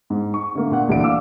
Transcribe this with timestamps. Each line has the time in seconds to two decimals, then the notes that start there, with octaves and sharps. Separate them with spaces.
0.10 G#2
0.34 C#6
0.55 D3 A3 A#3
0.72 A#2 F#5
0.89 D2 A#2 E3 D5 D7
1.04 F5 D6 E6